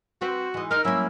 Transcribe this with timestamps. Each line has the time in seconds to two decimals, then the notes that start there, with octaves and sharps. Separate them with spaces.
0.21 C4 F#4 B4 C5
0.54 E3 G#3 D#4
0.71 D#4 A#4 F6
0.85 F#3 A#3 C#4 E4 E6